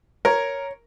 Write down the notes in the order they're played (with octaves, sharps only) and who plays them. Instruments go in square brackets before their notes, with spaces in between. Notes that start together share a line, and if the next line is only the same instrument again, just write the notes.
[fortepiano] A#4 [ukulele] C#5